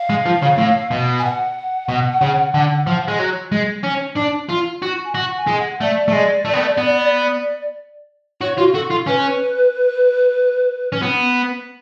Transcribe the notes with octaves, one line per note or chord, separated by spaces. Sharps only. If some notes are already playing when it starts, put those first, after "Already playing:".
Already playing: F5
G#3
F3
C#3
A2
B2
G#5
F#5
B2
C#3
D3
F3
G#3
F#3
G#3
C#4
D4
F4
F#4
G#5
F#4 F#5
G#5
G#3
F#5
A3 D5
A3
G#3
A3
B3
A3
B3
F#4 C#5
F4 F#4
F#4 A4
F4
C#4 B4
C#4
B3